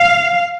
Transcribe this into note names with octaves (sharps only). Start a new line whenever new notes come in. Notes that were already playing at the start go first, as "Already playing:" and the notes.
Already playing: F5